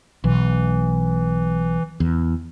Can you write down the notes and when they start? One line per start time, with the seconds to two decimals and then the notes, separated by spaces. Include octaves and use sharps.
0.24 B1 E3
2.00 E2